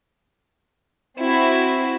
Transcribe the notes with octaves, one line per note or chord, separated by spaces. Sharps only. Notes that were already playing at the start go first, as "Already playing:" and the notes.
C4 E4 F#4